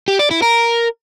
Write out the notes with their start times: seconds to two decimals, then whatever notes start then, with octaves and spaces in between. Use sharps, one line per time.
0.08 G4
0.19 D5
0.31 E4
0.43 A#4